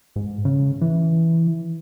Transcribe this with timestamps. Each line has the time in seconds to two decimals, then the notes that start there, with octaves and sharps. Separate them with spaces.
0.16 G#2
0.45 C#3
0.81 E3